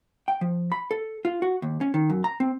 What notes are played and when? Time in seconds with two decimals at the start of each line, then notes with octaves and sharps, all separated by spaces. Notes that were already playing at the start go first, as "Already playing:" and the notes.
0.28 G5
0.41 F3
0.72 B5
0.91 A4
1.25 F4
1.42 F#4
1.62 D#2
1.81 C#4
1.94 D#3
2.10 F#2
2.24 A#5
2.40 C4